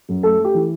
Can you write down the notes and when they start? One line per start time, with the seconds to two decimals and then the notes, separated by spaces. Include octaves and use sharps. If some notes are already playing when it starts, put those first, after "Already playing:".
0.09 F#2
0.23 A3 A4
0.39 A3
0.45 G4
0.54 E3